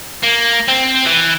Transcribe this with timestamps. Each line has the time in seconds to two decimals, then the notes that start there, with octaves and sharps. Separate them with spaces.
0.23 A#3
0.68 C4
1.06 E3